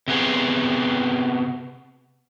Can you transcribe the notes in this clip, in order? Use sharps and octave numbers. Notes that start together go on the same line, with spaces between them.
C3 B3 G#4